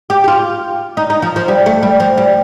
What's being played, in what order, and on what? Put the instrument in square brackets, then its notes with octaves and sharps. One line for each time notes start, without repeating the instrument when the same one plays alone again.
[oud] G4
G4
F4
D#4
D#4
F3
F3
G3
A3
G3
F3
G3